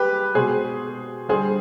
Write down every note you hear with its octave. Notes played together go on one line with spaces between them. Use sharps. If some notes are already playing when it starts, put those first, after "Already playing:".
Already playing: G#3 G4 B4
B2 G#3 G#4 C5
D3 G3 G#4 C5